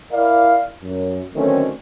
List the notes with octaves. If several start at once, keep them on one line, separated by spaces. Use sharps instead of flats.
E4 A#4 D5 F5
F#2
D3 D#3 F#3 A3 C4 C#4